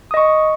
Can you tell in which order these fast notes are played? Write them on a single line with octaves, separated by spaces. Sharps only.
D#6 D#5 C#6